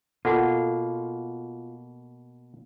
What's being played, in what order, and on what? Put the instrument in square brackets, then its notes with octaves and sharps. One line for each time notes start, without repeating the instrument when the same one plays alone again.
[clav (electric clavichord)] B2 A#3 [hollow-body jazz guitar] F4 [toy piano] A4 F#5